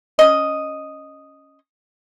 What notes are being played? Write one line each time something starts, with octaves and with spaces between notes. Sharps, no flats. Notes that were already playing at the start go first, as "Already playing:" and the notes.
C#4 D#5